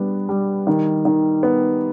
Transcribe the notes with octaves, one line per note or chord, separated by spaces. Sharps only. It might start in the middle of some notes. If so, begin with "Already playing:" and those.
Already playing: G3 B3 D4
G3
D#3
D#3
B3